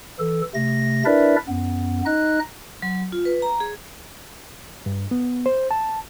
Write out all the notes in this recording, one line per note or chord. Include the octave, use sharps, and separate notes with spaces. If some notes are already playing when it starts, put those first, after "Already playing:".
E3 A4
C3 A3 A#6
D4 E4 A#4 B4 D5 E5
F#2 B3
D#4 D#5 F#6
F#3
F4
B4
A#5
G#4
G2
B3
C5
A5